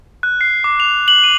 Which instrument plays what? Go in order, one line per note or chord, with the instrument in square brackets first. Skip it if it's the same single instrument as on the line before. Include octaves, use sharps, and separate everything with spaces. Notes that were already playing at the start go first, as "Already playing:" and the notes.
[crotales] F#6
C7
D6
F7
F#7
D#7